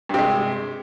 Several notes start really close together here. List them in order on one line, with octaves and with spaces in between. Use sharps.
G2 C3 G#3